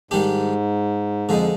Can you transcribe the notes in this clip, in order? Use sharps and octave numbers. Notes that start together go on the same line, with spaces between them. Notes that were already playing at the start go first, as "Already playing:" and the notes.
G#2 D#3 G3 D4 G4
F2 D3 F3 G#3 D#4